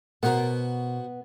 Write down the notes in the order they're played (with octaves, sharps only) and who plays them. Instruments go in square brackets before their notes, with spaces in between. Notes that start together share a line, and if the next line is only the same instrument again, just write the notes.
[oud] B2 A#4 [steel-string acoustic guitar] B3 [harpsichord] F#4 C5 F#5